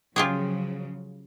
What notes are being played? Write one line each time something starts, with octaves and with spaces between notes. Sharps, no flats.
C#3 F3 F#3 F4 G4 G#4